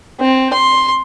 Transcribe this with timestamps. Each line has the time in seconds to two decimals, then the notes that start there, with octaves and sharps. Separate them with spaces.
0.20 C4
0.53 C6